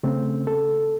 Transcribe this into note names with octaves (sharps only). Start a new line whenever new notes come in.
C#3 A3 C4
A4